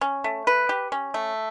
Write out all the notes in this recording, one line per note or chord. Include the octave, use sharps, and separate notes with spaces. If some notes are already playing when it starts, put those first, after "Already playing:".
C#4
A3
B4
G4
C#4
A3